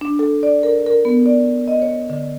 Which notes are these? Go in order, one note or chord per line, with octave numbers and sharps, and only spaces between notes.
D4
A4
D5
A#4
A#4
B3
D5
D#5
C#5
D3